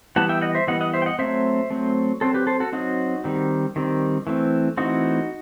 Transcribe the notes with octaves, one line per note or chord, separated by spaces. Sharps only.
E3 G3 B3 F#5 A5
E5 G5
D#5 F#5
C5 E5
E3 G3 B3 D#5 F#5
D#5 F#5
C5 E5
G5
D#5 F#5
F#3 A3 C4 C5 E5
F#3 A3 C4
F#3 C4 A4 C5
G4 B4
A4 C5
F#4 A4
F#3 C4 D#4 F#4
D#3 G3 C4
D#3 G3 C4
E3 A3 C4
E3 A3 C4 D#4 F#4